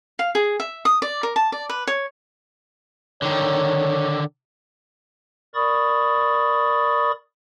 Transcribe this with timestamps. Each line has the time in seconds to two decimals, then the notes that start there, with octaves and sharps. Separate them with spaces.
0.19 F5
0.35 G#4
0.60 E5
0.85 D#6
1.02 D5
1.23 A#4
1.36 A5
1.52 D5
1.69 B4
1.87 C#5
3.22 D3 D#3 C#5
5.54 A#4 D5 B5 C#6 D#6 A6